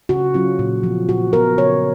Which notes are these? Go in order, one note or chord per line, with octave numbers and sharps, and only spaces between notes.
C#3 F#4
F#3 C#4 F4
A#2
F3 B3
A#2 F#4
F3 B3 A#4
C#3 C#5